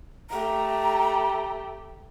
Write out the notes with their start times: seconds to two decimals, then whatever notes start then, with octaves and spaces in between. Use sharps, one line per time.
0.30 A3 G4 A#5